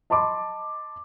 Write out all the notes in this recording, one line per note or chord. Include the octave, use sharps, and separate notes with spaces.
D#5 A5 B5 C6 D6